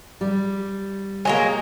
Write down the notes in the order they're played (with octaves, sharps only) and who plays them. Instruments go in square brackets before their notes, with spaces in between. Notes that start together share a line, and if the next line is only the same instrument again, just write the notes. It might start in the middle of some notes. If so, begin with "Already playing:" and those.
[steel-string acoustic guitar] G3
[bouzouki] F#3 G#3 A#3 [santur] G#5